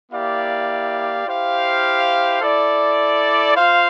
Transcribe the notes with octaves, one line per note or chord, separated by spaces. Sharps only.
A#3 E4 G4 D5 F5
E4 G4 C5 F5
E4 A4 D5
F4 C5 F5